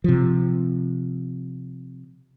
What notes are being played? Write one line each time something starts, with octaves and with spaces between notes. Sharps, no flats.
C3 F3